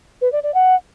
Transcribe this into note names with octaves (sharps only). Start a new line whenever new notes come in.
B4
D5
D5
F#5